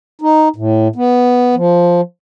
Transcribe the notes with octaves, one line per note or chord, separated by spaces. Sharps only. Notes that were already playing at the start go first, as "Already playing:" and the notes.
D#4
A2
B3
F3